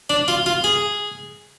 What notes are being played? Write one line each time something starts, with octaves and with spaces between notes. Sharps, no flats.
D4
F4
F4
G#4